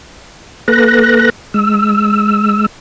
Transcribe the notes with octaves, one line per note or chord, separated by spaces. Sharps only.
A#3 A4 B4 F#6 A#6
G#3 E6